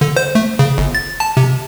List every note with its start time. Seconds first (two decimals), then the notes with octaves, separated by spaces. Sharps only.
0.01 D3
0.17 C5
0.35 A3
0.59 C#3
0.78 G1
0.95 A6
1.20 A5
1.37 C3